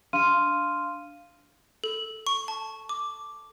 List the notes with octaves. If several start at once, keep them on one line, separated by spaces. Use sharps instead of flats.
D4 F5 C6 F6 D#7
A4
C#6
A5
D6